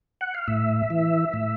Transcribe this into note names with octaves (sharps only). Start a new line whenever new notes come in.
F#5
F5
A2 E5
E3
A2